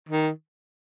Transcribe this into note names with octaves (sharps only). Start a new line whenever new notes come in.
D#3